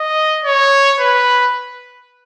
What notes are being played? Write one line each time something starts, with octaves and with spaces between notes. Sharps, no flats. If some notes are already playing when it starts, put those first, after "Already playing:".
Already playing: D#5
C#5
B4